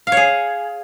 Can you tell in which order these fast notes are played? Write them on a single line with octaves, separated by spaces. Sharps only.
F5 C#5 G#4